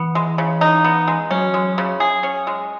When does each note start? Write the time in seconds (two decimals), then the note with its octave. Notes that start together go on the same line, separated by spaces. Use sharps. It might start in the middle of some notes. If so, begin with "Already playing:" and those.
Already playing: E3 B3
0.15 G#3
0.38 C#3
0.61 D#4
0.84 B3
1.08 G#3
1.31 F#3 C#4
1.54 G#3
1.78 C#3
2.00 G#4
2.23 C#4
2.47 G#3